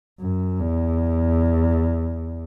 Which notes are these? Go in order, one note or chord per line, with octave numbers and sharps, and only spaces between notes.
F#2
E2